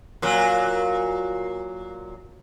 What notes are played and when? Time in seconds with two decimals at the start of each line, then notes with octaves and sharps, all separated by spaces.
0.22 A#2 F#3